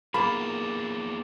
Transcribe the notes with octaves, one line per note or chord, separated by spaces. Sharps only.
A#3 B3 F4 G#4 B5 D6 A6 E7